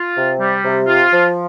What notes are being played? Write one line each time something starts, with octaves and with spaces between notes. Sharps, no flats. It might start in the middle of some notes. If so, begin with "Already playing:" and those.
Already playing: F4
C3
G3
C3
F4
F3